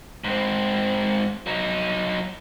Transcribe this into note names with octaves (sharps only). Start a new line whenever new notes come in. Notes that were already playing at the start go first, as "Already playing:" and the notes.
G#2 C4
F#3 D#4